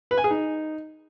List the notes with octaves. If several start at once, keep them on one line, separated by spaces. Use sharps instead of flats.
B4
G#5
G#4
D#4